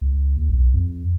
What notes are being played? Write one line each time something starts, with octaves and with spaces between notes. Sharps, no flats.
C#2
D#2
B1
F2